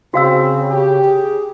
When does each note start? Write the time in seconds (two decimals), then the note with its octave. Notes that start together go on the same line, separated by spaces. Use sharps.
0.14 C#3 C4 F#4 F5 E6
0.69 G4
1.04 G#4